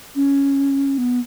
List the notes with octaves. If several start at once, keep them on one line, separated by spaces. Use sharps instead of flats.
C#4
B3